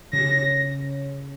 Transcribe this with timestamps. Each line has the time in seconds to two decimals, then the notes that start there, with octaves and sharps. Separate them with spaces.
0.13 C#3 A#6